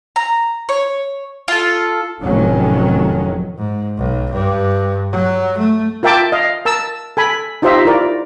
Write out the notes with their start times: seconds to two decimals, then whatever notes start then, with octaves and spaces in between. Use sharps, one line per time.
0.16 A#5
0.69 C#5
1.48 F4 A4
2.22 F1 A2 D#3 F#3 C#4
3.58 G#2
3.97 B1
4.32 G2
5.11 F#3
5.58 A3
6.03 F4 A#4 E5 G5 A5 D6
6.32 D#5 F5
6.65 A#4 A5 E6
7.17 A4 G#5 B5
7.62 D#4 F4 G4 C5 D#5 E5
7.85 E4 F4 A#4 D5